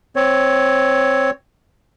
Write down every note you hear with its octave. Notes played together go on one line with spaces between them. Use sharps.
C4 C#5